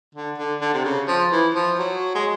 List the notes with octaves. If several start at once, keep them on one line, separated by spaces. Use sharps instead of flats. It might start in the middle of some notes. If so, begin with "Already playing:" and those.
D3
D3
D3
C3
C#3
F3
E3
F3
F#3
G#3